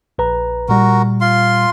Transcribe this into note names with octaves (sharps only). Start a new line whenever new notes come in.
A#1 B4 A#5
A#2 G3 F#4 A#4
F4 C6